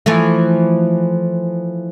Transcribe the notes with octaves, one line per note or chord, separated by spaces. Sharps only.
E3 F3 A3